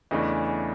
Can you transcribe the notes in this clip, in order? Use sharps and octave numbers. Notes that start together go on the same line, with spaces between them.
E2 C#3 E3 A3 D4 D#5